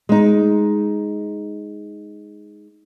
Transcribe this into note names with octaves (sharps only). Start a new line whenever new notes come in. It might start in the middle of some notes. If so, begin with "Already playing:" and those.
G#3 D#4